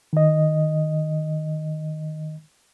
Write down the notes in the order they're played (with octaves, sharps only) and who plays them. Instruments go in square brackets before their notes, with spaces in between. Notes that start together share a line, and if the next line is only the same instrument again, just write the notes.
[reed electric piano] D#3 D#5